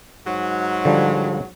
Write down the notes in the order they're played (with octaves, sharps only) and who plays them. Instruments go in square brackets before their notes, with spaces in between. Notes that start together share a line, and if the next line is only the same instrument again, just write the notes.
[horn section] G#2 F#3
[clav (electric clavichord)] D3 F3 G3